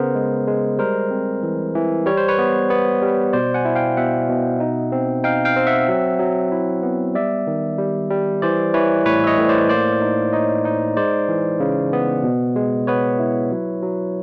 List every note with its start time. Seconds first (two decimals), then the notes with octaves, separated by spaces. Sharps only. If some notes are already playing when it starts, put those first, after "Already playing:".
Already playing: C#3 B3 A#4 C5
0.15 G#3
0.47 G#3
0.78 G3 A#4 C5
1.11 C4
1.43 E3
1.75 E3
2.06 G3 C#5
2.18 C5
2.28 B4 C#5
2.39 B3
2.70 B3
3.02 G3
3.33 B2 C5 D5
3.54 F#5 G#5
3.65 E4
3.75 F5 G5
3.97 B2 E5 F#5
4.29 B2
4.60 D#4
4.92 C4
5.24 D#4 F5 G5
5.45 F5 G5
5.56 C4
5.67 E5 F#5
5.89 F#3
6.19 F#3
6.52 E4
6.83 B3
7.15 G3 D5 E5
7.47 D#3
7.78 G3
8.10 G3
8.42 E3 C5 D5
8.74 E3 B4 C#5
9.06 A2 B4 C#5
9.24 E5
9.27 C#5 D#5
9.38 A2
9.49 C5 D5
9.69 A#3 C5 D5
10.01 D#4
10.33 D#4 C#5 D#5
10.65 D#4
10.97 G#3 C5 D5
11.29 E3
11.60 C#3
11.93 B3
12.24 B2
12.56 G#3
12.87 B3 B4 C#5
13.19 E4
13.52 F#3
13.83 F#3